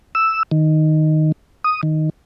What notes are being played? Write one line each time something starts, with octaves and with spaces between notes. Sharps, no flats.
E6
D#3
D#6
D#3